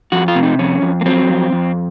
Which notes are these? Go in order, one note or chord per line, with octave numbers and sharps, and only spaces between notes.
F2 F#4
F4
C3
D#4
F2 C#4
F2
A#3
F#3 C4
F2
F2